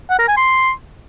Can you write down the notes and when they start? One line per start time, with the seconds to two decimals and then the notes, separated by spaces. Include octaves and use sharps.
0.10 F#5
0.19 A#4
0.28 G#5
0.37 C6